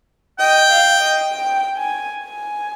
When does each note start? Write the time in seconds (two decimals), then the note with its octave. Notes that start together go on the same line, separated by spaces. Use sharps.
0.39 D#5 G5
0.71 F5
1.00 D#5
1.32 G5
1.77 G#5
2.23 G#5